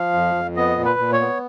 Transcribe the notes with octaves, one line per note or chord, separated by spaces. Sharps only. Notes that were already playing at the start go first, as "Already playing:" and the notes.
Already playing: F3 F5
F2
F2
B3 D#5
A#2
B4
A#2
C#5
B3